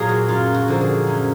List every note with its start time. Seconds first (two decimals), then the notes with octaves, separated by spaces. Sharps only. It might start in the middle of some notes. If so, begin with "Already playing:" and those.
Already playing: A#2 F#3 A#3 G#4 A#4
0.09 F#4
0.28 F#2 F4
0.54 F#4
0.68 D3 F3 A#3
0.81 G#4
1.07 F#2